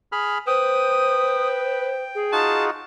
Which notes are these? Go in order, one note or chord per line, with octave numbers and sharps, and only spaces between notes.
G#4 B5 F6
B4 C5 G5 D#6
G#4
D#4 F4 F#4 A5